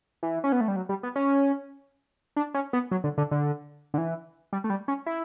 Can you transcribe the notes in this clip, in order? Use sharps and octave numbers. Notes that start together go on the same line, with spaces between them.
E3
C#4
B3
A3
G3
F#3
G3
B3
C#4
D4
C#4
B3
F#3
D3
D3
D3
D3
E3
G3
A3
G3
C#4
E4